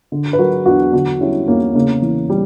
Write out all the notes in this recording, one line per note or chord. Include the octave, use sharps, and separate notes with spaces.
D3
B4
F#3 F#4 A#4
E2 D4 F#4
D3 D4 F#4
G3 C#4 E4
E2 A#3 C#4
C#3 A#3 C#4
E3
G3